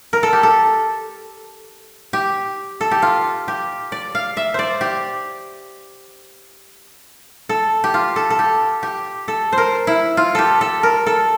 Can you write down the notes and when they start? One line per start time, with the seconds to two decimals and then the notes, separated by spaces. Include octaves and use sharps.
0.13 A#4
0.23 A4
0.33 G4
0.43 A4
2.13 G4
2.81 A4
2.91 G4
3.02 F4
3.48 G4
3.92 D5
4.15 F5
4.37 E5
4.54 C5 D5
4.81 G4
7.49 A4
7.84 G4
7.94 F4
8.16 A4
8.30 A4
8.39 G4
8.83 G4
9.28 A4
9.52 C5
9.58 A#4
9.87 E4
10.17 F4
10.35 G4 A4
10.61 A4
10.83 A#4
11.06 A4